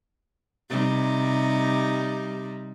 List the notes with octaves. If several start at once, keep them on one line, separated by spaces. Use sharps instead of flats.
C3 G3 D#4